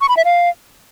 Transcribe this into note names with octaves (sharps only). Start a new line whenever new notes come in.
C#6
B5
E5
F5